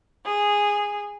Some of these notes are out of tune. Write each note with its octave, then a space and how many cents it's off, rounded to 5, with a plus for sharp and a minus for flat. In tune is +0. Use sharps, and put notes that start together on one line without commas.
G#4 -10